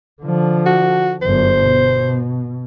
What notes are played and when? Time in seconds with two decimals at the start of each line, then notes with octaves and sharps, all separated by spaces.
0.22 D3 F3
0.66 F#4
1.21 G1 F#2 C5
1.64 B2